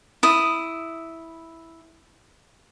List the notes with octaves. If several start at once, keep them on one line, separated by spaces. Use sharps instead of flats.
E4 D#6